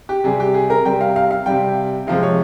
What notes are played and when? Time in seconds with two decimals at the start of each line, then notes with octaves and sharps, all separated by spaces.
0.09 G4
0.24 C3 G3 G#4
0.40 G4
0.54 G#4
0.70 A#4
0.85 C3 G3 G5
1.01 F5
1.16 F5
1.31 F5
1.46 C3 G3 G5
2.07 C3 F3 G#3 F5
2.22 C#5